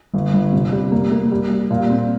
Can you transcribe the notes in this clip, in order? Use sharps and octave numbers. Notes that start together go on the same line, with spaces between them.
G1
G1
C3
G3
A#3
A#3
G3
G3
A#2
C4